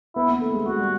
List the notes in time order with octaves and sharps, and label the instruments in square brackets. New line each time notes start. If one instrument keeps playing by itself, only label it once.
[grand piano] B3 [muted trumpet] E4
[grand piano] A#3
A3
G#3
[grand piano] G#3 [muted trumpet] F#4
[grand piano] G3